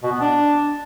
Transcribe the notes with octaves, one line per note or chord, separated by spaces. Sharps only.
B2
B3
D4